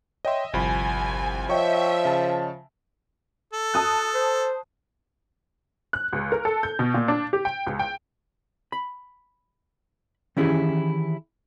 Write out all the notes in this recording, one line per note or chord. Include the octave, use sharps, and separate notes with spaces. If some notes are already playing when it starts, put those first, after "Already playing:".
C#5 D#5 E5 G5 C6
G1 C2 F3 G#5 B5
F3 C#5 D#5 E5 G5 C#6
C#3 A5
A4
A5 D#6 F#6
C5
F#6
C#2
A#4
A4
G6
B2
A#2
D4
G4
G5
C#2
G5
B5
D#3 E3 C#4 E4 G4 G#4